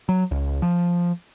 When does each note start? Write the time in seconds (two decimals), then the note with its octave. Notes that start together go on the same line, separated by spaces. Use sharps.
0.09 F#3
0.31 C#2
0.62 F3